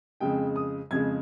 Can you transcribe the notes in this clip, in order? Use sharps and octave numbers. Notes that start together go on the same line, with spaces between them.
F2 C#3 G#3 G5
D#6
F2 C#3 G#3 G#6